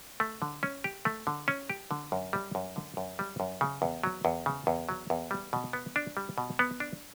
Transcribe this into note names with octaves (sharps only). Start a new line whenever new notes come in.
A3
D3
C#4
G4
A3
D3
C#4
G4
D3
F#2
G3
F#2
D3
F#2
G3
F#2
C#3
E2
F#3
E2
C#3
E2
F#3
E2
G3
B2
B3
D4
G3
B2
B3
D4